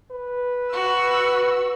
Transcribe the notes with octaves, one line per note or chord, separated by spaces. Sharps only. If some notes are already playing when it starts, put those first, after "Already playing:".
B4
F#4 E6